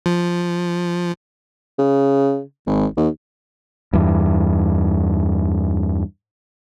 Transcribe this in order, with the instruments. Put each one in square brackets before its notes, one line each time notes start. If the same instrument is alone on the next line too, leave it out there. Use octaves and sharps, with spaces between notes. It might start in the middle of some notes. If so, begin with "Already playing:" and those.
[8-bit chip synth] F3
[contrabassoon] C#3
G#1
D#2
[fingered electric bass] E2 G2